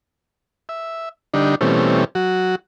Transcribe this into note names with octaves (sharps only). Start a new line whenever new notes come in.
E5
D3 G3 D4 D#4
B2 E3 G3 A3 C4 C#4
F#3 F#4